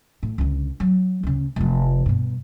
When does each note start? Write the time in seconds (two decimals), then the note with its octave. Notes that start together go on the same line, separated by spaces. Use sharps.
0.23 A2
0.38 C#2 D3
0.80 F#3
1.23 D2 C#3
1.56 F1 F3
2.06 G2 B2